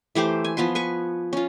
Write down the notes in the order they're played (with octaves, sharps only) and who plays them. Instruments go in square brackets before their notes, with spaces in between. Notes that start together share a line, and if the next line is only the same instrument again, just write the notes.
[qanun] E3 A3 G4 C5
G#5
F3 B3 B4 C6
B4 G#5 C#6
C#4 F4